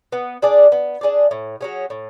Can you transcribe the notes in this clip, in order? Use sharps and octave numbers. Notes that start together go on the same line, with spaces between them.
B3
D4 G#4 D5
B3
D4 G#4 D5
A2
F#3 C#4 G#4
A2